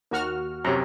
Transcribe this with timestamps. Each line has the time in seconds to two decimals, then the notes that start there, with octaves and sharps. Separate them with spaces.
0.11 D#2 F#4 A#4 F6
0.65 F#2 C3 G4 C#5 A#5